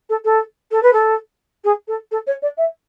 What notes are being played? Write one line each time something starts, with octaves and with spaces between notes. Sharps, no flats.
A4
A4
A4
B4
A4
G#4
A4
A4
C#5
D5
E5